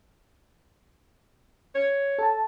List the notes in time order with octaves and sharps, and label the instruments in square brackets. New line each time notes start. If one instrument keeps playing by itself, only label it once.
[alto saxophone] C#5
[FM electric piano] A4 A5